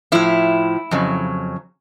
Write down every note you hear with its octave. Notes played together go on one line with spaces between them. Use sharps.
A2 F3 E4
F2 C#3 F#3